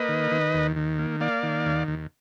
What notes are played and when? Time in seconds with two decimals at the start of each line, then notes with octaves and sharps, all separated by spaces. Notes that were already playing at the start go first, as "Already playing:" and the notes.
Already playing: A#3 B4 D#5
0.09 D#3
0.31 D#3
0.54 D#2
0.76 D#3
0.99 A#3
1.20 A#3 D5 F5
1.43 D#3
1.66 D#2
1.88 D#2